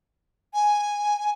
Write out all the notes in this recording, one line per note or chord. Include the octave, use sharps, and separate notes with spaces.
G#5